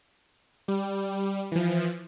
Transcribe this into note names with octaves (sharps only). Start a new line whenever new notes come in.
G3
E3 F3